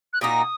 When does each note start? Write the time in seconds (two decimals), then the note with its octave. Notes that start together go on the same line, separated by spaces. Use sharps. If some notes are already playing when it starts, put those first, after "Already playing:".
0.13 F#6
0.21 A#2 A#3 D#4 F#4 D#6